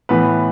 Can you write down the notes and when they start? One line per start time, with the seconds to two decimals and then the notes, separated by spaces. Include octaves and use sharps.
0.09 A2 E3 B3 B4